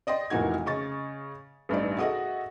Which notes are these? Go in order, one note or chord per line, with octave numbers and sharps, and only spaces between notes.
D5 D#5 G5 C6
F1 A#2 E3 D#4 F#4 G#6
C#3 D#5 C#6 A6
A1 G2 D#4 D5
F#4 G#4 A4 D#5 E5 F#5